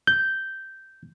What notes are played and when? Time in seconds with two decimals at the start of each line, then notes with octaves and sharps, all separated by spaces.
0.07 G6